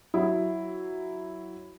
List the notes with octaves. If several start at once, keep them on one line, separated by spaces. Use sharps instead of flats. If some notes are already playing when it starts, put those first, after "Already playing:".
F#3 E4